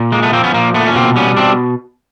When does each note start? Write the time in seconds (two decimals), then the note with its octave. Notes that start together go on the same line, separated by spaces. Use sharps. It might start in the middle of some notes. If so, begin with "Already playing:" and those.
Already playing: A#2
0.12 G#3 A#3
0.23 A3 B3
0.33 F3 A#3 C4
0.44 B3 C#4
0.54 A#2 A#3
0.74 A#2 A3 B3
0.86 C#4
0.95 B2 A#3 C4
1.16 G3 B3 C#4
1.37 B2 C4 D4